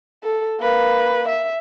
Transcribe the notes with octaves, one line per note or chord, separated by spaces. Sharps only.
A4
A#3 B4
E5